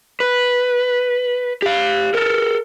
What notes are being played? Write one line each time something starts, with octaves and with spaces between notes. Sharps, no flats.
B4
G4 F5
A4 A#4